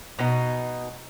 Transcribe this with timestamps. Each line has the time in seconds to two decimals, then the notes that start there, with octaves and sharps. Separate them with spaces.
0.19 B2 D#4